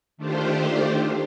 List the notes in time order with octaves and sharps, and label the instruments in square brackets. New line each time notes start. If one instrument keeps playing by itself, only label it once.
[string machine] D#3 A3 D4 F4 G4 C5